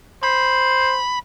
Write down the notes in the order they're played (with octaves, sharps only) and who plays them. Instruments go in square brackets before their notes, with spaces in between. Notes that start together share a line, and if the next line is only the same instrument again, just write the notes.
[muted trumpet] C5 [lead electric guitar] B5